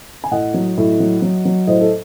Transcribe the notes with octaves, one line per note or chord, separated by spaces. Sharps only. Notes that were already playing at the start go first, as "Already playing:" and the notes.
G#5
A2 D#5 F#5
F#3
A2
F#3
F#3
F#3
A2 C5 D#5
A4